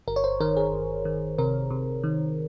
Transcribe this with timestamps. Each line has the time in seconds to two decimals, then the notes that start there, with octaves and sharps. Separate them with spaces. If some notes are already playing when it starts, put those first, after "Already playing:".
0.08 G1 A#4
0.16 C#5
0.24 C5
0.40 D#3 A#4
0.57 G#4
0.73 G1
1.05 D#3
1.38 C3 A#4
1.71 C3
2.04 D#3